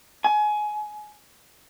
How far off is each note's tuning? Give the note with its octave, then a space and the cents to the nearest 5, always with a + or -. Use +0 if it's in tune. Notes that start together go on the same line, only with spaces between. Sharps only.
G#5 +20